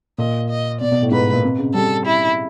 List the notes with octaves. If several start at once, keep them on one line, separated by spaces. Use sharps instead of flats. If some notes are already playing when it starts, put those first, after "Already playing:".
A#2 D#5
D#5
B2 D5
B2
A2
G#2 B4
A#2
C3
C#3
G3 A4
E4